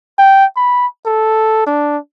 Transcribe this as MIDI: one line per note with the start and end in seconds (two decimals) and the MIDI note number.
0.18 0.45 79
0.56 0.86 83
1.05 1.62 69
1.67 1.97 62